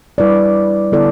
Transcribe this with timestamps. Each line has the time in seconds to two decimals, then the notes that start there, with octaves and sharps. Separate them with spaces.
0.18 G3 E4 B4 D5
0.92 D3 B3 E4 A4 D5